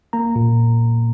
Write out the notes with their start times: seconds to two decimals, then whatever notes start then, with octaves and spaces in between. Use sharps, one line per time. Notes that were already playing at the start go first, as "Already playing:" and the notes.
0.13 A#3 A#5
0.36 A#2